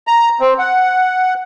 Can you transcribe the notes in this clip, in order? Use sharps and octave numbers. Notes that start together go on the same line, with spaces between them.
A#5
C4
F#5